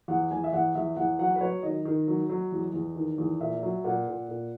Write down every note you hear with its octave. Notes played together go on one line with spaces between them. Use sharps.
E2 F#5
E2 G#5
E5
E2 F#5
E2 E5
E2 F#5
F#3 F#5
B4
F#3 C#5
D#3 D#5
D#3
F#3
F#3
E2
E2
D#3
E2
A#2 E5
F#3
A#2 F#5
A#2
A#2